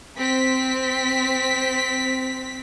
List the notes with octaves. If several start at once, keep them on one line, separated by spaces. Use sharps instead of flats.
C4 B6